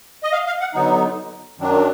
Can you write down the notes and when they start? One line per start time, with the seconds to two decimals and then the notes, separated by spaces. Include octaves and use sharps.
0.23 D#5
0.33 F5
0.47 F5
0.61 F#5
0.74 D3 F#3 B3 D#4
1.58 F#2 D#3 F#3 D4